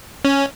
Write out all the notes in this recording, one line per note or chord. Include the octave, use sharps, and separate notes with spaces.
C#4